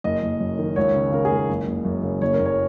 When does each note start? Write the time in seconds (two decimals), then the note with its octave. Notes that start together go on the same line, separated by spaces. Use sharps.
0.04 F#1 D#5
0.22 F#1
0.40 F#2
0.59 D#3
0.76 C#2 C#5
0.94 C#3
1.12 C#3 A#4
1.25 G#4
1.30 C#2
1.37 A#4
1.48 F#1
1.67 F#1
1.85 F#2
2.03 C#3
2.22 F#1 C#5
2.33 A#4
2.39 F#1
2.46 C#5